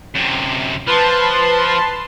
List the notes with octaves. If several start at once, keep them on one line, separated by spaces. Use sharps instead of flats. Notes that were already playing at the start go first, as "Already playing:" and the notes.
F#2 C3
F3 B4 A5 C6